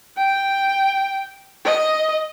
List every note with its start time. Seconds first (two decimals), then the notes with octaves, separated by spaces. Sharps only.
0.17 G5
1.65 D#5